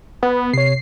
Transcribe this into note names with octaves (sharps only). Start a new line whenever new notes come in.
B3
C3 C#5 C7